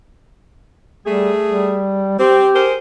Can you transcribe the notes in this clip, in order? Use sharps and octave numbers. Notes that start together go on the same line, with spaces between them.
G3 A3 G#4
G3
C4 G4
G#4 A#4 C5